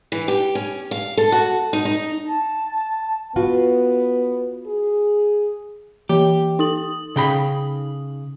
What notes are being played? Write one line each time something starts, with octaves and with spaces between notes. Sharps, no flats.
E3
G4
C#4
F5
A4
F#4
D#4
D#4
A5
B3 F4 F#4
G#4
E3 G4
D#4 D#6 F#7
C#3 G5 B5